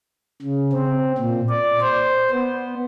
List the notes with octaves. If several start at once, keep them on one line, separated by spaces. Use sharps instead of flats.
C#3
C4
A#2
D5
C5
B3